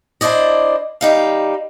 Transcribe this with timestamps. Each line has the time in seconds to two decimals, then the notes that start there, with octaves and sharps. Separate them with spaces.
0.21 D4 E4 C5 D5 D#5
1.01 G3 D#4 F5